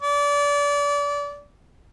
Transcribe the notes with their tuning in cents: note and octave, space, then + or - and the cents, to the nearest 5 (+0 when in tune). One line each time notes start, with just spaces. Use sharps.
D5 -30